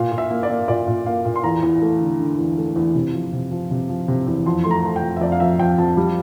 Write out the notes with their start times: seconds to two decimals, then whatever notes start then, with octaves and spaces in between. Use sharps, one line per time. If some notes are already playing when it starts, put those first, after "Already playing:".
Already playing: A#2 F5
0.12 A#2
0.18 E5
0.30 A#3
0.43 D5
0.49 A#3
0.68 A#2 D5
0.87 A#2
1.06 A#3 F5
1.25 A#2
1.36 C6
1.44 E2 A#5
1.63 E2
1.81 A3
2.00 D3
2.20 D3
2.38 E2
2.57 A3
2.76 E2
2.95 C3
3.13 F3
3.33 C3
3.51 F3
3.71 C3
3.89 F3
4.08 C3
4.27 E2
4.46 F2 C6
4.64 A3 C6
4.71 A#5
4.84 A3
4.96 G5
5.02 F2
5.17 E5
5.21 F2 D5
5.32 F5
5.40 F2 E5
5.59 F2 G5
5.78 F2 A5
5.97 G3